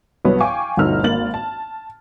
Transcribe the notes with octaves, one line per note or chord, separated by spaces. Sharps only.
C2 F#3 B3 C#5
F5 G5 G#5 C#6 D6
G1 D2 B2 D#4 E6 F6
G#1 A#3 A6 F#7
A5